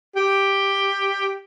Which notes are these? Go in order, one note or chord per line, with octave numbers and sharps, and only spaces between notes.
G4